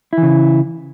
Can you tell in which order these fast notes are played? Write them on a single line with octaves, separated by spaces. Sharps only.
E4 E3 C#3